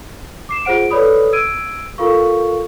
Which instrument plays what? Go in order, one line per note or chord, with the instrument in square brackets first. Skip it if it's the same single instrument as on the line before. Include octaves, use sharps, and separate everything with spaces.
[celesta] D6 C7 E7
F4 G#4 C5 F#5 D7
A4 B4 C#5 D5 B5 D#6
E6 G#6 D7 D#7
F4 A4 A#4 F5 C#6